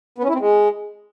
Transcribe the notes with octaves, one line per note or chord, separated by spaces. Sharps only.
B3
C#4
E4
C4
G#3